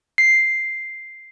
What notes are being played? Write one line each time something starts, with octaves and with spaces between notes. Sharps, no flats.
C7